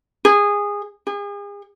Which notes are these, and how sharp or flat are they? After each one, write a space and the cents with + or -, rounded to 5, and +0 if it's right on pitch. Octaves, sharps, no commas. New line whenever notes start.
G#4 -20
G#4 -40